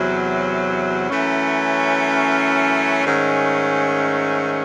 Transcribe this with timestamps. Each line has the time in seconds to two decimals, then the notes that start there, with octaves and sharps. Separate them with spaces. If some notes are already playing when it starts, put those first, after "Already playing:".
Already playing: E2 C3 F#3
1.09 F#2 E3 A3 C#4
3.05 G#2 D#3 A3 C#4